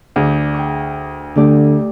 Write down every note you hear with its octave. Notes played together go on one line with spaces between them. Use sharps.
D2 G#4 D5
G5 C#6
D3 A3 G4 D5